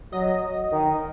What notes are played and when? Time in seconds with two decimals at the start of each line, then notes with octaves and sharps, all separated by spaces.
0.13 F#3 D#5
0.72 D#3